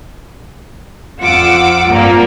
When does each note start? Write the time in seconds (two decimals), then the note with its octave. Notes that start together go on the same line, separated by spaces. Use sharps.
1.21 F2 F4 F#5 D6 E6
1.89 G2 A#2 G3 A#3 C4